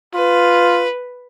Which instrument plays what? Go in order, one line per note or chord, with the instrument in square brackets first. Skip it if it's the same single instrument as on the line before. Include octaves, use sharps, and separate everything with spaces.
[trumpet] F4 [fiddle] B4